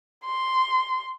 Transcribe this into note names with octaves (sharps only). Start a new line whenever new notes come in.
C6